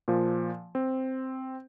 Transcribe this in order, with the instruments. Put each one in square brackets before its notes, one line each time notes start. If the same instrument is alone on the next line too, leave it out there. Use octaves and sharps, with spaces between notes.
[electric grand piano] A#2 F3
C4